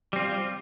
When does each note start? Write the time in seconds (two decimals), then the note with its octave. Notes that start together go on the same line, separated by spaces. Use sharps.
0.13 G3
0.16 C4
0.19 F4